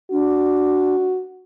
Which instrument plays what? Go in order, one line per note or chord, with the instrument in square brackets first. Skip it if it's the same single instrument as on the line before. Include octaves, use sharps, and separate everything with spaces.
[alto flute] D4 [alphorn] F#4